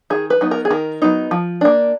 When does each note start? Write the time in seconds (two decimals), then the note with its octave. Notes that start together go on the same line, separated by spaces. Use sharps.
0.10 D#3 G#4
0.30 B4
0.41 F#3 B3 D#4
0.51 A#4
0.65 G#4
0.70 D#3 A#4
1.02 F#3 B3 D#4
1.31 F3
1.61 A#3 D4